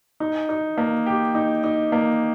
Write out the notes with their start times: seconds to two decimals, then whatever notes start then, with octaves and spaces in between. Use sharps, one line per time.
0.20 D#4
0.49 D#4
0.78 A#3
1.06 G4
1.35 D#4
1.64 D#4
1.92 A#3